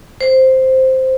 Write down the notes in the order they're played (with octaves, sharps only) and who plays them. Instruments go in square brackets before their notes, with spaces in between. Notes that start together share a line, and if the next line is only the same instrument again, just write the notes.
[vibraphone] C5